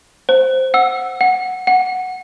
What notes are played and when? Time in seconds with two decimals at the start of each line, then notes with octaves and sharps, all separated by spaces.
0.29 C5
0.74 F#5 E6
1.21 F#5
1.67 F#5